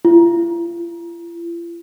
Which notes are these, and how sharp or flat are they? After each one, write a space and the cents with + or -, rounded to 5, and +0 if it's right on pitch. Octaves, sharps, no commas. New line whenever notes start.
F4 -45